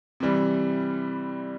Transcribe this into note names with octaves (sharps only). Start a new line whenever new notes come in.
C3 E3 G3